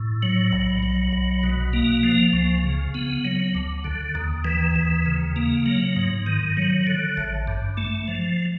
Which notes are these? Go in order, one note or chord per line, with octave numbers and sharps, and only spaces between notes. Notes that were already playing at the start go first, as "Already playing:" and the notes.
Already playing: A2
F#3
B1
F#3
B1
B2
A#3
F3
C#2
C#3
B3
F#3
D2
D3
D#2
E3
D#2
C#3
A#3
F#3
G#2
D#3
F#3
D3
A1
G2
A3
F3